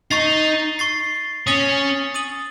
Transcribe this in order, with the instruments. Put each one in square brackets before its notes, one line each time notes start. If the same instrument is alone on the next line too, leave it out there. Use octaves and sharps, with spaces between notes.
[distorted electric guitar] D#4 [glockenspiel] C#6 A6 C7
[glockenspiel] C#6 A6 C7
[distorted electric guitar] C#4 [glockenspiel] D#6 A6 D#7 F#7
[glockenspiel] D#6 A6 D#7 F#7